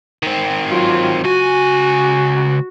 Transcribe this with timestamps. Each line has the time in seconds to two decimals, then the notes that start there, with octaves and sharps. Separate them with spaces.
0.23 D#3 C4
0.69 F#3 F4
1.24 C#2 F#4 G#5